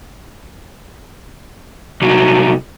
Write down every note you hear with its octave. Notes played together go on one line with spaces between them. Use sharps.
C2 F#3